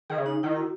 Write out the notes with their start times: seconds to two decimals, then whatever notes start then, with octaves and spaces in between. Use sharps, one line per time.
0.10 D#3 G#4
0.18 C#3
0.26 D#4
0.43 D#3 E4
0.56 F#4